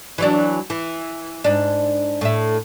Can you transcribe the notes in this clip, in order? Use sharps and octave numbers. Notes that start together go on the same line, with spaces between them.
E3 F#3 D4
E3
G#2 D4
A2 E5